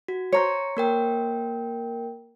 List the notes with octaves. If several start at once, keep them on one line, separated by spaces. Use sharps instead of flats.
F#4
C5 C#5 A#5 C#7
A#3 A#4 G5